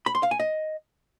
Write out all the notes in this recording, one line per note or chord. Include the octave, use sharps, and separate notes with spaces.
B5
C6
F5
G#5
D#5